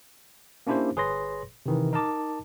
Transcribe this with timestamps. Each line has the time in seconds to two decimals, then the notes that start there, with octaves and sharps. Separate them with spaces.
0.67 A#3 C#4 D4 E4 G4 C5
0.96 G1 G#4 B4 C#5 C6 A#6
1.66 C3 D#3 E3
1.93 D#4 A#4 D#5 A5 D6